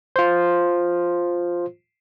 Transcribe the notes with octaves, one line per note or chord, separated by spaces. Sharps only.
F4 C5